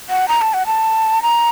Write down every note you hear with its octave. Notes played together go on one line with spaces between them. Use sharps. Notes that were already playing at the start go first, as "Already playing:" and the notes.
F#5
A#5
A5
F#5
A5
A#5